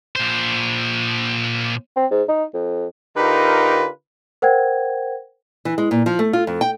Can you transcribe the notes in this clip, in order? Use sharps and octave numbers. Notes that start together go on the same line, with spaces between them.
A#2 C5
C4
G#2
D#4
F2
D3 D#4 F4 G4 A#4 B4
A#4 C5 F#5 G5 G#6
E3
G#3
A#2
F3
A3
F4
F2
G5